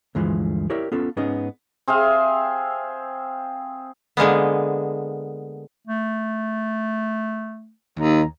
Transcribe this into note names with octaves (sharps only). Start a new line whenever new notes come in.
D2 G2 E3 F3 G#3
E4 G4 A#4 C#5 D5
B3 C#4 F4 A4
G#2 B3 C#4 D#4 G#4 D#5
C4 G#4 E5 F5
D3 G#3 A#3 B3
A3
D#2 A#5